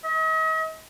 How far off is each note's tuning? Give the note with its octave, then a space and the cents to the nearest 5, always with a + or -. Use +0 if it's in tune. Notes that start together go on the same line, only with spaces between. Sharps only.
D#5 +40